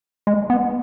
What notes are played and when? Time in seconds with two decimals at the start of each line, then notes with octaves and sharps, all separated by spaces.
0.27 G#3
0.50 B3